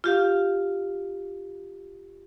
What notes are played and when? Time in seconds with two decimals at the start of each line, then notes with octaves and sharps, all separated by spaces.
0.04 F4 G4 F5